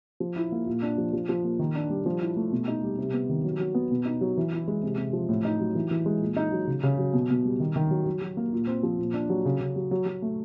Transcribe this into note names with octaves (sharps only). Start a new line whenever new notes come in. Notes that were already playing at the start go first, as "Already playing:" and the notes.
F3
E4
A#3
A#2
D4
F3
F3
F3
A#3
D#3
D4
G3
F3
E4
A3
B2
D#4
G3
C3
B3
D#3
F#3
F#3
B3
B2
D#4
F#3
E3
E4
G#3
C3
C3
F3
A2
D#4
F#3
E3
E3
G#3
A#2
D#4
F#3
C#3
C#3
F#3
B2
B2
G3
D#3
D#3
F#3
F#3
F#3
A#3
A#2
C4
F3
A#2
D4
F#3
C#3
C#3
F#3
F#3
F#3
A3